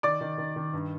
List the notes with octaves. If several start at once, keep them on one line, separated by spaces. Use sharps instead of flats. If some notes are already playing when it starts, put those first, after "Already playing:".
D#3 D5 D6
D#3
D#3
D#3
G2